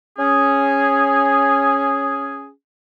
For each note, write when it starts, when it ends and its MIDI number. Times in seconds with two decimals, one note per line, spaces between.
0.19 2.50 61
0.19 2.50 68